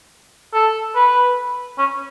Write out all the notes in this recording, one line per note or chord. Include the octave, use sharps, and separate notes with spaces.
A4
B4
C#4